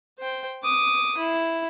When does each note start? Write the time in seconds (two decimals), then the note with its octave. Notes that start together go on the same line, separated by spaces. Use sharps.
0.19 C5 G5
0.63 D6 D#6
1.17 E4